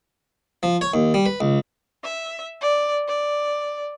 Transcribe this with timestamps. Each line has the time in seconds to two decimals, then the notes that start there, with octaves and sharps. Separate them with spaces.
0.63 F3
0.81 C#5
0.94 D#2
1.14 G3
1.26 B4
1.41 C#2
2.04 E5
2.61 D5
3.08 D5